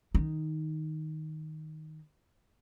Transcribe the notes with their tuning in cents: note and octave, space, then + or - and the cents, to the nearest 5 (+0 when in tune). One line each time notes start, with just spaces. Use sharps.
D#3 +0 D#4 +0